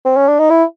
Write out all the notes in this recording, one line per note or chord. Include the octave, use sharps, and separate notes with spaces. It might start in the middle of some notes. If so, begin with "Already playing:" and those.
C4
C#4
D4
D#4
E4